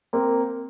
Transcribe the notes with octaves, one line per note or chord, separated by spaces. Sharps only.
A#3 C4